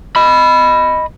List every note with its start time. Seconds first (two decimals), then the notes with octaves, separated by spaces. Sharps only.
0.16 D#5 B5